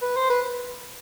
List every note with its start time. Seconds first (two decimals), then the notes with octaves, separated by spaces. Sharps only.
0.02 B4
0.16 C5
0.30 B4